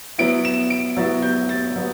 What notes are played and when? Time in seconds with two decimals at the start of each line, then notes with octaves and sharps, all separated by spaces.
0.18 F#3 B3 E4 D7
0.45 E7
0.70 D7
0.97 F#3 B3 E4 A6
1.23 G6
1.49 A6
1.76 F#3 B3